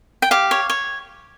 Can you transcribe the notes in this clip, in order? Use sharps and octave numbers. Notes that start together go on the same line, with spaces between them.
G5
G4 F5
C#5
C#5